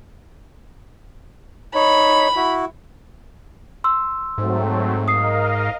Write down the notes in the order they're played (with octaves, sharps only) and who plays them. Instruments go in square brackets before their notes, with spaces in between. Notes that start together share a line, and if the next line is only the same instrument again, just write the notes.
[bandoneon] D#4 C#5 [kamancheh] B5
[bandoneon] E4 F#4
[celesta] C6 E6
[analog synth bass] G#2 [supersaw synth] F#3 A3 C4
[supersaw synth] A#4 D#5 F5 [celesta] D#6 C7